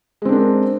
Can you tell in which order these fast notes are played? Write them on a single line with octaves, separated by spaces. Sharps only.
G#3 C4 D4 A#4